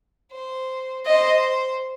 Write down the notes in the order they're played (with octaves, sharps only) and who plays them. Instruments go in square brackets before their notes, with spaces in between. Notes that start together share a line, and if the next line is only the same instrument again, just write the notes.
[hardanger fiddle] C5
[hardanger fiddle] C5 [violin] D#5